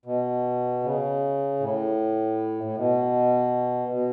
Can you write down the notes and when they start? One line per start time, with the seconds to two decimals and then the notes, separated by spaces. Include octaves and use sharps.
0.05 B2
0.83 C#3
1.60 A2
2.64 A2
2.77 B2
3.92 B2